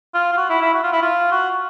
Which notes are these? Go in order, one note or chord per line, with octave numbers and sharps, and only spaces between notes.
F4
F4
F#4
E4
E4
F#4
F4
E4
F4
F#4